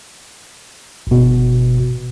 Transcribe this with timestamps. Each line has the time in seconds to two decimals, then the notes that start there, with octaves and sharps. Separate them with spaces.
1.07 G1 B2